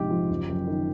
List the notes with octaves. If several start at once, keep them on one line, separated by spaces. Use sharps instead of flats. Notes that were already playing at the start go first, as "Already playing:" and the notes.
Already playing: A#1 G#2 C3 G4 G5
F3
F#1
F#2
D#3